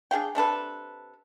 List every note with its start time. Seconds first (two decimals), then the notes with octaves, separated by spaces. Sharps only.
0.11 D4 G#4 F5 G5
0.35 C3 D4 A4 B4